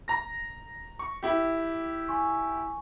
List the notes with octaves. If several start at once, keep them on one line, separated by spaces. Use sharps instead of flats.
A#5 A#6
C#6
E4 G4 D6
G#5 C6 C#6